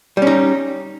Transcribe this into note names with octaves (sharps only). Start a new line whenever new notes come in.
G3 C#4 D#4